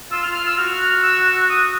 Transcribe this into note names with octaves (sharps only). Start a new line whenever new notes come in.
F4 E6
F6
F4
F6
F4 E6
F#4 F6
F6
F6
E6
D#6